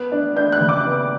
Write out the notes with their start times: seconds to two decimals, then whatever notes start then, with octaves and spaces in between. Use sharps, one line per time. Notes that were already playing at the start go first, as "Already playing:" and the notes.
Already playing: B3 F#6
0.12 D4
0.36 D4 G6
0.52 F#6
0.61 C#3
0.69 D6
0.85 B3